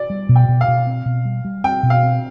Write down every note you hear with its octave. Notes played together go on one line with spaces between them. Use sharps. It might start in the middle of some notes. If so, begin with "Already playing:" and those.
Already playing: D5
G3
B2
G5
B2
F5
B2
C4
B2
G3
G3
C4 G5
B2
F5
C4